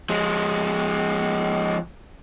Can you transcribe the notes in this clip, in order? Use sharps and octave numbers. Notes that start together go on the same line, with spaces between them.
F3 G#3